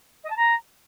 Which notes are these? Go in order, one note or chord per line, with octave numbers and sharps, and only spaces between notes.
D#5
A5
A#5